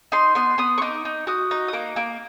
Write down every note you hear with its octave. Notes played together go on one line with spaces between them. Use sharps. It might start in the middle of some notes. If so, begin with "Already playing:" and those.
D#4 C6
B3 C6
B3 D#6
C#6
D#4 D6
D#4
F#4 D#6
D#4
D#6
A#3 D6
A#3 D6